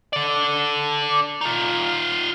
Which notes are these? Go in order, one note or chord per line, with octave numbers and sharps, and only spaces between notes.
A4 D5
D#4 F4